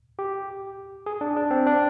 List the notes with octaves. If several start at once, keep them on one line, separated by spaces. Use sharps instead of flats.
G4
G#4
D4
D4
C4
D4